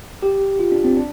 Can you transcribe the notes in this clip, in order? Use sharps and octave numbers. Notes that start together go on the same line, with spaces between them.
G4
F4
D4
C4
D4